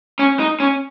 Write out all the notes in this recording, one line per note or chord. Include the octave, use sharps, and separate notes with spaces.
C#4
D#4
C#4